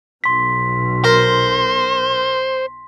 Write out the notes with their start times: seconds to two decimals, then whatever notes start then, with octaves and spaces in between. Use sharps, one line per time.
0.24 B1 B2 C6 B6
1.04 A#4 C5